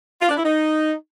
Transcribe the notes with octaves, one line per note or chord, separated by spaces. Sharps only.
F4
D4
E4
D#4